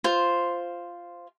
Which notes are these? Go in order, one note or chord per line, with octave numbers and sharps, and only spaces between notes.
F4 C5